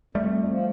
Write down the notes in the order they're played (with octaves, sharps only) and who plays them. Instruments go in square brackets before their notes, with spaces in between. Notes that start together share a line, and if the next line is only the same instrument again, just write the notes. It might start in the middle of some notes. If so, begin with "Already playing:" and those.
[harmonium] F2 [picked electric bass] G3 A3
[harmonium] F2
F3